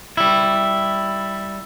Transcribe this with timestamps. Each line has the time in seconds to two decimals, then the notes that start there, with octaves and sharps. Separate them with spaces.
0.17 G3 E4